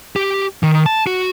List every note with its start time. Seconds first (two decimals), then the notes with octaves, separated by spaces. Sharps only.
0.16 G4
0.63 D#3
0.86 A5
1.07 F#4